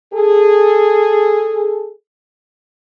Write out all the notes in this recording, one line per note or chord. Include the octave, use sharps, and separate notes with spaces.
G#4 A4